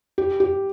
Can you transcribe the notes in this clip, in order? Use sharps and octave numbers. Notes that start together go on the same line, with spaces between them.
G4
G4